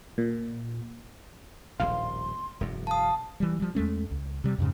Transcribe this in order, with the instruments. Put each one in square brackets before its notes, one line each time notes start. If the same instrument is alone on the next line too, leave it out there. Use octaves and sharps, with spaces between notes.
[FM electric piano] A#2
[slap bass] D#1 A#1 A2 [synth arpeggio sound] F5 [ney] C6
[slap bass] E1 F#2
[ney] F5 [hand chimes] A5 D#6
[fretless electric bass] E3 G3
F3 G3
E2 G#3 A3 C#4
C#2
C3 G3
F2 G#2 C#3